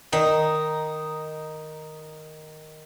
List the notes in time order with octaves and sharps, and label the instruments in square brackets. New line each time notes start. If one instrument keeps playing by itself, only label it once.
[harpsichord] D#3 [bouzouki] D#4